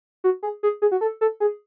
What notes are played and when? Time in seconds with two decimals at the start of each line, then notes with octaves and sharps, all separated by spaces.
0.24 F#4
0.43 G#4
0.63 G#4
0.82 G#4
0.92 F#4
1.01 A4
1.21 A4
1.40 G#4